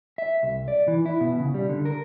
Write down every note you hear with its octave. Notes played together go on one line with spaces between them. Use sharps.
E5
C2
D5
E3
E4
B2
C#3
G3
D3
A#4